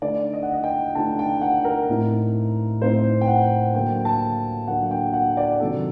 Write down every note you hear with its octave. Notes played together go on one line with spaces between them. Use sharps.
D3 A3 D#4 D5
D#5
F#5
D#5
G5
D3 A3 D#4 A5
G5
F#5
A#4
A2 A3 C4 D#4
A2 A3 C4 D#4 C5
G5
F#5
D3 F#3 A#3 D4 G5
A5
D3 F#3 A#3 D4 F#5
G5
F#5
D5
C3 D#3 F#3 C4 D#4 A4